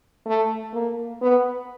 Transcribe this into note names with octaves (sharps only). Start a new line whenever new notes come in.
A3
A#3
B3